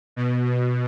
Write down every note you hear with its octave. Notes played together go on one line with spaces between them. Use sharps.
B2